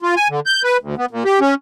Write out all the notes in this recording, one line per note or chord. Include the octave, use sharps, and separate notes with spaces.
F4
G#5
D3
G6
B4
D2
B3
A#2
G4
C#4